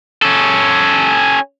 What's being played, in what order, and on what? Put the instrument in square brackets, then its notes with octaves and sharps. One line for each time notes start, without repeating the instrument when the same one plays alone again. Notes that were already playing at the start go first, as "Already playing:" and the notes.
[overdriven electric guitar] C#4 A4